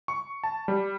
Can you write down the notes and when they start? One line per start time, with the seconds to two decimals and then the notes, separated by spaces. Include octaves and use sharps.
0.08 C#6
0.44 A5
0.68 G3